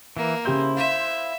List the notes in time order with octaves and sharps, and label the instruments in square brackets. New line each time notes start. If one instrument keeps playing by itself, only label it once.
[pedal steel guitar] E3 [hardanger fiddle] A#3
[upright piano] C#3 G4 G6 [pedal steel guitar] E4 C5
[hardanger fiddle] E5 [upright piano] F5